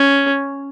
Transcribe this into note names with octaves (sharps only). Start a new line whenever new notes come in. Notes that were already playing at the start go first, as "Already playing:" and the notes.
Already playing: C#4